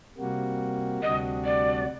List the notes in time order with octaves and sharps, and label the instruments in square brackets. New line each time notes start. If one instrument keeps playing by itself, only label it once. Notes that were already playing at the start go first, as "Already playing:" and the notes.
[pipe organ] C3 G3 A#3 F#4
[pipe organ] D2 C3 G3 D4 F#4 [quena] D#5
[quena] D5